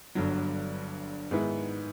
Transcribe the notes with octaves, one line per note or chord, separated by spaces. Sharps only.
G1 G2 D3 F#3
G#2 D#3 G#3 B3 E4